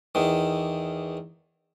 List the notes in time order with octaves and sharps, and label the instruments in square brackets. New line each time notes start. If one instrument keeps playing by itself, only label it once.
[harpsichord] E2 D#3